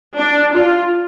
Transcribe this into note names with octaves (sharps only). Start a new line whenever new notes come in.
D4
F4